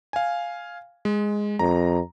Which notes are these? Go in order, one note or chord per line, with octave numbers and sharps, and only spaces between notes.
F5 G#5
G#3
F2 A#5